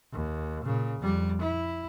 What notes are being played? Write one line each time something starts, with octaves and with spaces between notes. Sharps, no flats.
D#2
A#2 C#3
F2 G3
E4